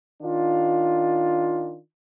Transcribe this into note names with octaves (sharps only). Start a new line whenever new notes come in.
D#3 D4 F4